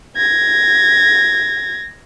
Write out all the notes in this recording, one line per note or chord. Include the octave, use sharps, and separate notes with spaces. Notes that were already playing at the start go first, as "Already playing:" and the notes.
G#6 A#6